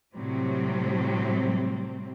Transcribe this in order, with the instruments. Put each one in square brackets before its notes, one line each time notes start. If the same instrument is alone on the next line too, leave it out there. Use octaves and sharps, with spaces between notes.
[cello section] A2 C3 F#3 G3 C4